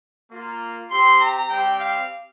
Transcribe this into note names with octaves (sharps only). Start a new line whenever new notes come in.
A#3 F4
C4 G4 C6
A#5
G3 C4 G4 G5
F5